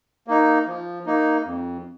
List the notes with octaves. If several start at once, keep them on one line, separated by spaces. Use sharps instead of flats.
A#3 D#4
F3
A#3 D#4
F2